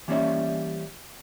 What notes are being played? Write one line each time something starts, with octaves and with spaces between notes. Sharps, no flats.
E3 G3 A#3 C#4 C#5 E5